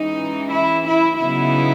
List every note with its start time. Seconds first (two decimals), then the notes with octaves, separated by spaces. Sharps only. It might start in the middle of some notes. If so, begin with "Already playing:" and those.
Already playing: E3 G#3 C#4 D#4
0.53 E4
0.88 E4
1.21 C#3 F#3 B3 D#4 E4